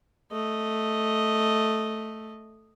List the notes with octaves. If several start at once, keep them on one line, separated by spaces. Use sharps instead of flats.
A3 D#5